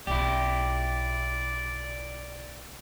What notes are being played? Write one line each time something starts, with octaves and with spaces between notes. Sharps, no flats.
B1 B3 E4 G4 D5